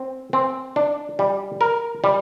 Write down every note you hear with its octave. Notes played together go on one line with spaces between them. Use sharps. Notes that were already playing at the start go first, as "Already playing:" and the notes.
Already playing: C4
C4
D4
G3
A#4
G3